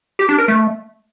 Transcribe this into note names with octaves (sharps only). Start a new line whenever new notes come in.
G4
D4
A#4
A3